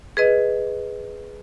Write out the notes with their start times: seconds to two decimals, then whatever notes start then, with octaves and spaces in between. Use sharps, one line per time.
0.17 G#4 B4 D#5